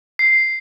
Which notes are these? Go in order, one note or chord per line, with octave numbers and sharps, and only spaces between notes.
C7